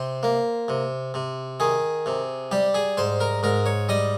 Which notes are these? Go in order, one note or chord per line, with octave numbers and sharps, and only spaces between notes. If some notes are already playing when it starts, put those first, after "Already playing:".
Already playing: C3 C5
A#3
C3
C3
D#3 G#4
C3
G3 G4
G#4
G#2 C5
A#4
G#2 A#4
C#5
G3 D#5